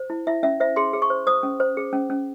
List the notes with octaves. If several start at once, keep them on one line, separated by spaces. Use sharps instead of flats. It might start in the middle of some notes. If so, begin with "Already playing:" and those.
Already playing: C5
E4
E4 E5
C#4 E5
C5 E5
G#4 C6
G#4
C#6
C5
C5 D#6
C#4
C5
G#4
C#4
C#4